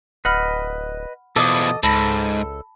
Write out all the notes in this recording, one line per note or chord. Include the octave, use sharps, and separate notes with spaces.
D1 B4 D#5 F#5 B5 F6
E2 B2 F3 A4 D#5 D6 D#6
C#2 G#2 A4 A5 B5 A#6